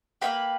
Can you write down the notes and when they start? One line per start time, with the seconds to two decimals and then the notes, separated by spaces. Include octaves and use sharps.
0.21 A#3 E4 G4 B4 B5